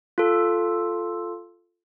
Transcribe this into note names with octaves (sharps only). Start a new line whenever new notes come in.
F4 A4